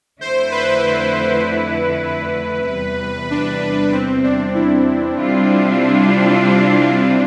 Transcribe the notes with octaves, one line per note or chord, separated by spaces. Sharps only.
F2 D3 A3 E4 C5
B4
B4
E2 C3 G3
D4
C4
D4
E4
C3 G3 D4 F4